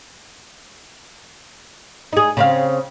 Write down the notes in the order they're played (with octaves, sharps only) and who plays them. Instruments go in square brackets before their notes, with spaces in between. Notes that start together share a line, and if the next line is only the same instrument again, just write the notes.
[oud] D#4 G#4
C#3 C4 F5